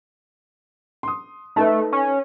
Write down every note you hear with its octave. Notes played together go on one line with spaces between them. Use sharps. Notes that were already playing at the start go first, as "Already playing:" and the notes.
C6 D#6
A3 D#4 A4 B4
C#4